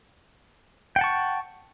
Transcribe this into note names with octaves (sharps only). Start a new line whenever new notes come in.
F#5 G5 A5 C#6